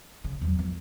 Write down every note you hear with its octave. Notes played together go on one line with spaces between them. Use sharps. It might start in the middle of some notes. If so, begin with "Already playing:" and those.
C#3
E2 F#3
E2 F3